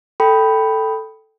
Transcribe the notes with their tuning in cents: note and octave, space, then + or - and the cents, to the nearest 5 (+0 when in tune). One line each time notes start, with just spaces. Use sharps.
A4 +0 G5 +0 B5 +0